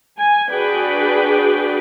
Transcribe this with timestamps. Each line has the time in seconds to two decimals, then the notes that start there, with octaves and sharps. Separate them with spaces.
0.19 G#5
0.51 D4 F#4 G#4 B4 D5 G5